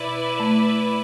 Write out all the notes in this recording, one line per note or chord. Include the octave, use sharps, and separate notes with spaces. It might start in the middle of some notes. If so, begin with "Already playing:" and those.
Already playing: B2 E4 B4 D5
A3